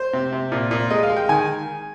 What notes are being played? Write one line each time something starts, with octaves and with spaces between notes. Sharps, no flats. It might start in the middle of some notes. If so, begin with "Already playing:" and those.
Already playing: C5
C3
C3
A#2
A#2
G#3 D#5
F5
G#3
G5
D#3 G#5